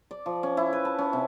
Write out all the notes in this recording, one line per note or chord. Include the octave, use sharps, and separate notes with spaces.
D5
F3
C#4
E4
B4
A5
C#4
C3